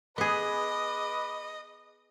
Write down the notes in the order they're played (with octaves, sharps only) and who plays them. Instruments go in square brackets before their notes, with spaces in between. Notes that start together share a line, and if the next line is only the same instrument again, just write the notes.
[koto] B3 G#4 [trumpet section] B4 B5 D6 [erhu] D#5